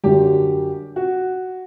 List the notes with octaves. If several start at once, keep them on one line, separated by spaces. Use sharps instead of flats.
F#2 D3 F#3 G4
F#4